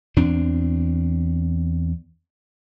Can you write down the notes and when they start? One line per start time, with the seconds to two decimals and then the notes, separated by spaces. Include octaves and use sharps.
0.17 E2 C4 D4